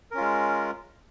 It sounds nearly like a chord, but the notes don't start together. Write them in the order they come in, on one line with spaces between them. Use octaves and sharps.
A#4 C#4 F4 G#3